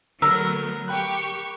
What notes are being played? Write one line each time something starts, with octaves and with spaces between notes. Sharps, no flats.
D3 F#3 A3 B3 A#4 E6
G4 G5 B5 C#6 F#6